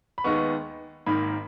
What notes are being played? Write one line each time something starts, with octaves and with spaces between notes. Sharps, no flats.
B5
D#2 D#3 G#3 B3 C#6
G#1 G#2 D#3 A#3 B5